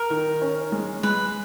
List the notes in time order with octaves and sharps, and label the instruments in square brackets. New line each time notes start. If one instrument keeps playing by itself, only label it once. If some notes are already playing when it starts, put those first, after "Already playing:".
Already playing: [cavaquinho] A#4
[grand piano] D#3
C#4
G#3
[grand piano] G#3 [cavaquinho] B4